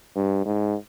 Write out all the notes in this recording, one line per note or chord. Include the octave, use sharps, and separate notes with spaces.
G2
G#2